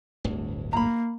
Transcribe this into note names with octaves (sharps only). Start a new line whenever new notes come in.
D1 G1 D2
A#3 A#5 B5